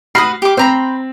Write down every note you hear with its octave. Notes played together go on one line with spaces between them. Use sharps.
F#4 B4 B5 D#6 F6 C7
G4 D6
C4 C5 A#5 B5